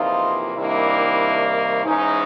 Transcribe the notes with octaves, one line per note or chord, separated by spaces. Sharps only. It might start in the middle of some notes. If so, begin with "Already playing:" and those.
Already playing: E2 C3 F3 A#3 D#4 F4
C3 D#3 G3 A#3 D4 E4
G#2 E3 G#3 C#4 D#4